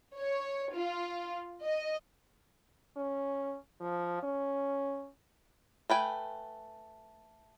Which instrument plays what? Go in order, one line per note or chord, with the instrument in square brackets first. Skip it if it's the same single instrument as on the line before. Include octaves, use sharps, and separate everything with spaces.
[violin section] C#5
F4
D#5
[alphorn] C#4
F3
C#4
[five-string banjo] A3 B4 G5 G#5